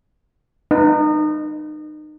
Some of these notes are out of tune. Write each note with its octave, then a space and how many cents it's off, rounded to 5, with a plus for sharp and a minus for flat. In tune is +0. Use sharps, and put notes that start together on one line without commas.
D#4 -30 B4 +0